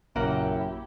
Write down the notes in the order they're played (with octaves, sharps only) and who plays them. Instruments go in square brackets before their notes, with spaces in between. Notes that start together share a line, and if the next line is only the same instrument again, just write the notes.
[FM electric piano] A#1 C#3 A#4 [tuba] F#2 [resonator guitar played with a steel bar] A#3 F#5 [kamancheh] E4 G4